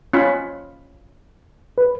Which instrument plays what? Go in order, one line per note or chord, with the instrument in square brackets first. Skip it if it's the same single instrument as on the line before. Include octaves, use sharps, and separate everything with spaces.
[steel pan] C#4 F4 B5
[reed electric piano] B4